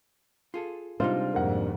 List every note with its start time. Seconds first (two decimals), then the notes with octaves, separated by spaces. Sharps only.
0.54 F4 G#4 A4
1.00 C3 G3 G#3 D4 D#4 F4 C5
1.34 F2 G#2 A#3 F#5